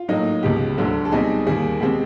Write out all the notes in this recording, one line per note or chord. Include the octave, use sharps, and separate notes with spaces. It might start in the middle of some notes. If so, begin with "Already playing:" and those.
Already playing: F4
A2 F#3 A#3 D#4
C#2 B2 G#3 G4
D2 D3 F#3
A4
B2 G3 C4 D#4 G#4
D#2 D#3 G3 A#3 G#4
B2 G#3 C4 G4